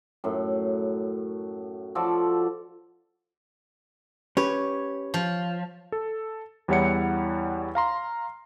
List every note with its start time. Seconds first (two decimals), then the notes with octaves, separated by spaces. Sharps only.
0.24 F#2 A2
1.95 F3 F#4 A4 D5
4.37 C#4 G4 B4 C#5
5.14 F3
5.92 A4
6.68 E2 G3 E4 C#5 F#5 C#7
7.75 F5 A#5 C6